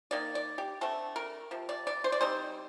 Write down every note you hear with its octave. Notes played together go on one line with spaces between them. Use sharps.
D#3 A#3 D#4 D5
D5
G4
D3 A3 C4 A4
A#4
C3 F3
D5
D5
C5
D5
G3 C4 D#4 C5